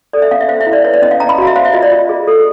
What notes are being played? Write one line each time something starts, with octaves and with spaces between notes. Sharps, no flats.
A4 D5
E5
C#4 F5
E5
C5 F5
E5
E4
D5
B4 C#5
D5
C#4 D#5
F5
C#4 A#5
B5
F#4 F5
E5
C5 F5
E5
F4 D#5
D5
F4
G#4
A4